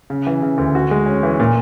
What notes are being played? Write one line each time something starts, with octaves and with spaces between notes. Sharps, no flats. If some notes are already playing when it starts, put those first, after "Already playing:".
C#3
E3
C#3
D2
F#4
G#3
C#4
E3
A#2